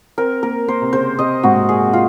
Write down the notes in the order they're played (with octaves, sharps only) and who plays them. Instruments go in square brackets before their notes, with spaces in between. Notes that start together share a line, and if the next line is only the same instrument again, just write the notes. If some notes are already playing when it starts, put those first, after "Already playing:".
[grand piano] C4 [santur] A#4
[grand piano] A#3 [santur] A#4
[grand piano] A#3 [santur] C5
[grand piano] C3
[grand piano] C#3 [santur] C5
[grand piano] C3 [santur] D#5
[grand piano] G#2 [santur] F#4
[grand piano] A#2
G#2
[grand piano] A#2 [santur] G#4
[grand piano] C3
[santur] F4